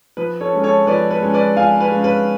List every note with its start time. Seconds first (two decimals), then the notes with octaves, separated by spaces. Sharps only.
0.17 F3 B4
0.41 A4 C#5
0.53 G#3 C#4
0.63 A4 C#5
0.87 F3 B4 D5
1.11 B4
1.22 G#3 C#4
1.34 B4 D5
1.57 F3 F5 G#5
1.81 B4
1.92 G#3 C#4
2.04 B4